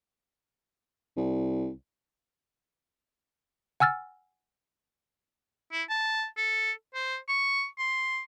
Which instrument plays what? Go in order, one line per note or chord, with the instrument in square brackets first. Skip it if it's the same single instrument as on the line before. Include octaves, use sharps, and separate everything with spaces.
[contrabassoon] C2
[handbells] F#5 G#5 E6 F6 A6
[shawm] E4
A5
A4
C5
C#6
C6